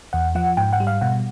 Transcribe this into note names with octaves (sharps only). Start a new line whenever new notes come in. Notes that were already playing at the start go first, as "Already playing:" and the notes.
E2 F#5
F3 F#5
G#2 G5
F#5
G3
F5
B2 F#5